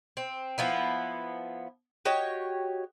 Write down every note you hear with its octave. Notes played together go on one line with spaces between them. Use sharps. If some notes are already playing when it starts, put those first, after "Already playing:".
C4
F3 B3 E4
F#4 G4 C#5 D#5